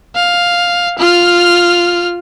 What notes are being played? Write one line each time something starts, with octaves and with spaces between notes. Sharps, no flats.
F5
F4 F6